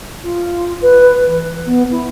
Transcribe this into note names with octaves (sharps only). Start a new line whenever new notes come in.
F4
B4
E3
B3
E4